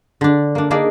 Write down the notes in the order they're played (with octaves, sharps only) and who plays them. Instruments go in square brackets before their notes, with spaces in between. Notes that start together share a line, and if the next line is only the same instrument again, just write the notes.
[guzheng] D3 D4
A#3 D4
A#3 D4 D#4 G#4 D5